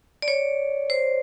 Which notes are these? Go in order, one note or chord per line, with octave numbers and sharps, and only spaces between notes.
D5
C#5
C5